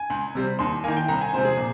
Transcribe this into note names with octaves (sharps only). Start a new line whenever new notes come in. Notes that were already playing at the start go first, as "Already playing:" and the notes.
Already playing: G#5
C#2
C3 G3 C4
D#2 C6
D#3 A#3 G#5
G5
C2 A#5
G#5
C3 F3 G#3 C4 C5
G#4
A#2